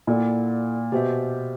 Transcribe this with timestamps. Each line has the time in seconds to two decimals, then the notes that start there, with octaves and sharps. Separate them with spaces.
0.07 A#2 E4 A4 D5 F#5
0.92 B2 G4 C5 E5